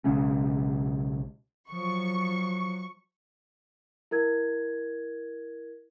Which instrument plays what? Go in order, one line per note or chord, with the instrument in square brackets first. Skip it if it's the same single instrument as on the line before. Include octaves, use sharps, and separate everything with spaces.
[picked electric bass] B1 C#3 G#3 C#4
[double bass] F3 F#3 [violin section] C#6
[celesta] E4 A#4 G#6